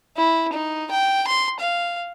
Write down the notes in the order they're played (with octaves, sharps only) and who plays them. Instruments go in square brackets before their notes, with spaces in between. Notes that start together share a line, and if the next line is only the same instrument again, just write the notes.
[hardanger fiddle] E4
D#4
G5
C6
F5